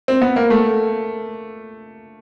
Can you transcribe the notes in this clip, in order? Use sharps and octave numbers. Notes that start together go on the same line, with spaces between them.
C4
B3
A#3
A3